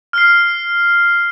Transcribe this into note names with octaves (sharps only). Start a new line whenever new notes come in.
F6 C7